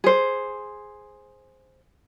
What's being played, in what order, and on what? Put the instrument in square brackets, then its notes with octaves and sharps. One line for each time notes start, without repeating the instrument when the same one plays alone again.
[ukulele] G#4 C5